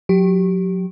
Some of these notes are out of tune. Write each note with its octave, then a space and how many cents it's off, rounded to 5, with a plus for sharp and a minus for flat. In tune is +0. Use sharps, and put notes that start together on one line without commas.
F#3 -30 G4 -15